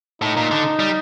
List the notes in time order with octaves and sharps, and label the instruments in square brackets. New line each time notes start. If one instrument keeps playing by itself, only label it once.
[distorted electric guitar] A2 [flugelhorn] D#4
[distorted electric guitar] A#2
D3
G3